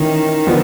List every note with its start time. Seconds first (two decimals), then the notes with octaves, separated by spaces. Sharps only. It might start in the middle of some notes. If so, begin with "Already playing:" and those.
Already playing: D#3 E3 C#4
0.47 D3 F3 B3